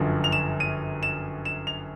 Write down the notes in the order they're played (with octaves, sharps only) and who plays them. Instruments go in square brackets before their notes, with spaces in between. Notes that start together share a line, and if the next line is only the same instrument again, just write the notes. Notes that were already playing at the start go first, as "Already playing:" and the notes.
Already playing: [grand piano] G1 F#2 D3 F3
F7
E7
D#7
E7
E7
F7